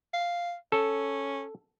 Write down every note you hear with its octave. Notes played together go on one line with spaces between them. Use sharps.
F5
C#4 A4